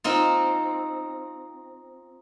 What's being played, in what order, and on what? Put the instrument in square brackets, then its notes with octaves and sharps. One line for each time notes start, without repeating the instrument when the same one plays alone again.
[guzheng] C4 D#4 F4